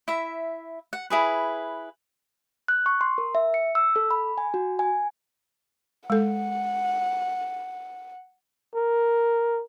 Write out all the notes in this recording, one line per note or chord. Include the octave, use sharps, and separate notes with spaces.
E4 E5
F#5
E4 G#4 B4
F#6
C#6
C6
A#4
E5
C#7
E6
A4
B5
G#5
F#4
G#5
G#3 A4 F#5
A#4